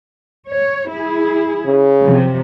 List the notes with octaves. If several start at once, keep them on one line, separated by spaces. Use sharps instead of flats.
C#5
E4 G#4
C#3
C3 F3 F#3